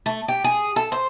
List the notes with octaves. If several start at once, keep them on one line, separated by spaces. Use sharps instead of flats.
A3
G4
G#4
A4
C5